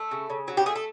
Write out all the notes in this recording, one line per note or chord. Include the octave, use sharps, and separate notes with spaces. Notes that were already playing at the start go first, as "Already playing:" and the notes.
Already playing: A3 A4
C#3
C#3
F#3
G4
A3 G#4
A4